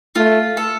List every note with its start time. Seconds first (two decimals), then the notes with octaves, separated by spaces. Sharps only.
0.15 A3 F4
0.57 A4